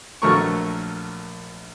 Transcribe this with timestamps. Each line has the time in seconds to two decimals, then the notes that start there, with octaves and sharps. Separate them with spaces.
0.22 A#1 F#3 A3 A#4 C#6